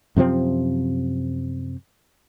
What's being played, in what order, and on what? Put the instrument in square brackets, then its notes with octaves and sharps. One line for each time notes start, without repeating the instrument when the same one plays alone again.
[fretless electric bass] F#2 C3 F3 C4